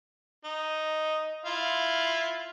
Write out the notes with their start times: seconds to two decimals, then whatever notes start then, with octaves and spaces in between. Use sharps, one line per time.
0.45 D#4
1.46 E4 F4 F5